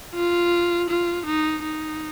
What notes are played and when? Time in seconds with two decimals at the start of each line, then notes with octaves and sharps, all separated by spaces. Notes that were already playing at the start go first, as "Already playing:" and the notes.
0.15 F4
0.90 F4
1.26 D#4
1.63 D#4